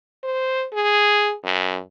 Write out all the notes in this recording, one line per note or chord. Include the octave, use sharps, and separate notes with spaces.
C5
G#4
F#2